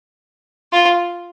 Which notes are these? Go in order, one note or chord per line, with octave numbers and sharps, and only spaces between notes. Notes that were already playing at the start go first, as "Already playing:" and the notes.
F4